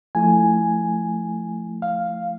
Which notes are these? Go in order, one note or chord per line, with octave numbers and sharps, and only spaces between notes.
F3 A3 E4 G#5
F5